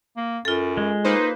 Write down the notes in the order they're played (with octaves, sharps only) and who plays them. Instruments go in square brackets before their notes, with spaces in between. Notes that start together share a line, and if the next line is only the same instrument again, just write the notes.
[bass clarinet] A#3
[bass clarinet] F#2 [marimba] F4 A4
[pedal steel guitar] G#3
[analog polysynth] A#3 B4 C5 [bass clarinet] D#4